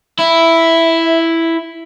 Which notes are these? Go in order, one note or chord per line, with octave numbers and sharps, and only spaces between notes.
E4 E5